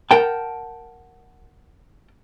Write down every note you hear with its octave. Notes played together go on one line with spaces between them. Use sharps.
A#4 F#5 G5 A5